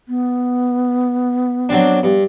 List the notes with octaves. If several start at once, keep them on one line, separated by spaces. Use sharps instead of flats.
B3
F#3 C4 D4
G2